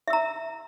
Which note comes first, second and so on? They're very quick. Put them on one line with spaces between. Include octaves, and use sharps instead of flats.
E5 E6 A#5